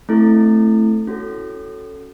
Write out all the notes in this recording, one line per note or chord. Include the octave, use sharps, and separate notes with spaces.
A3 C4 E4 A4
C#4 F#4 A4